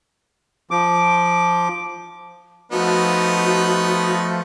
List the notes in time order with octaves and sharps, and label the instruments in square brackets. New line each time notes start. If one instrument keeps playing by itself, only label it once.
[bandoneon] F3 D6
[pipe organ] F3 A3 [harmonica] B3 D#4 [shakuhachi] F#4